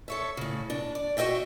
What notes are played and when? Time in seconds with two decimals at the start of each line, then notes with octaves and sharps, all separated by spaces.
0.08 A4 C#5 E5
0.37 A2 C#3
0.70 D4
0.95 D5
1.17 F#4 G4 D#5 E5 G5